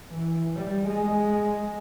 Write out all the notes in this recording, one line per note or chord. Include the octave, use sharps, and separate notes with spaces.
E3
G3
G#3